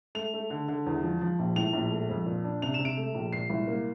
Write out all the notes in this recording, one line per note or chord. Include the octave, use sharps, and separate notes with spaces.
A3 F7
A3
D3
D3
E2
F3
F3
A#1
A2 F7
A#1
A3
F2
A#2
D4
C3 F7
C3 E7
D7
A3
A#1
A#2 C7
C2
A#3